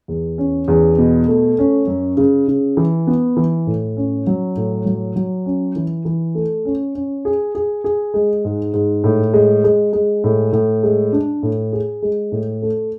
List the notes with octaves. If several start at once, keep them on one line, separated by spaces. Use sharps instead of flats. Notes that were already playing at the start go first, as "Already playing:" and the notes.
E2
C#4
E2
B2
A3
C#4
F#2
C#3
C#3
E3
B3
E3
A2
C#4
F#3
A2
F#3
F#3
C#4
E3
E3
A3
C#4
C#4
G#4
G#4
G#4
G#3
G#2
G#2
A2
G#3
G#3
G#3
A2
A2
G#3
D4
A2
G#4
G#3
A2
A3